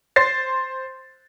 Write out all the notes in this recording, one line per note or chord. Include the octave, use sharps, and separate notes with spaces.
C5 A6 C7